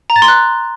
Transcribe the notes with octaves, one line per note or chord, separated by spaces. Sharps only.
A#5
A6
C6
F#6